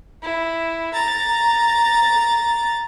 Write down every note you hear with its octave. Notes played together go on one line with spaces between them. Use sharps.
E4
A#5 A6